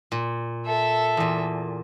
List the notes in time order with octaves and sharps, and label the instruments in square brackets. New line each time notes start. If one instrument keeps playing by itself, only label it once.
[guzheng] A#2
[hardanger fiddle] A4 E5
[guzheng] E2 A#2